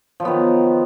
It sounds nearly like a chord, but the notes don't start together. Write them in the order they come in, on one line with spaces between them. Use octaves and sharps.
F3 F#3 B3 D#3